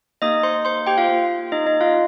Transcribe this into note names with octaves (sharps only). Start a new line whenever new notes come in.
A#3 D#4 G4 D#5 D#6
C5 C6
C5 C6
G4 G5
F4 F5
A#3 F4
D#4 D#5
D#4 D#5
F4 F5